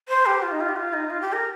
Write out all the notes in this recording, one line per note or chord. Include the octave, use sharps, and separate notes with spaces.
C5
G4
F4
D#4
F4
G4
F4
D#4
F4
G4
A#4